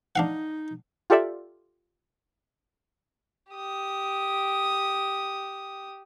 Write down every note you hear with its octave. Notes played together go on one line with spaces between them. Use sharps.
D4 D#4 F5 F#5
F4 G4 A4 D5 E5
G4 D#6